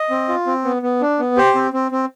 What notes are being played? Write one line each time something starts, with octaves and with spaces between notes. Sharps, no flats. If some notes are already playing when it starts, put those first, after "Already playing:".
Already playing: D#5
C4
F4
C4
B3
B3
D4
B3
G4 C5
C4
C4
C4